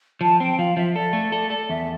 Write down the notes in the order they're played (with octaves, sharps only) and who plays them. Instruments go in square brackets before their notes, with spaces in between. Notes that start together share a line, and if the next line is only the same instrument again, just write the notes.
[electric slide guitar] F3 [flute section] A5
[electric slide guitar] C4 [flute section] G5
[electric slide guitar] F3 [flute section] F5
[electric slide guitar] F3 [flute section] E5
[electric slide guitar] A4 [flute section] D5
[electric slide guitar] A3
A4
A4
[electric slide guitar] E2 [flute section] E5